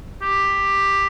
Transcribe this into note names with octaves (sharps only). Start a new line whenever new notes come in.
G4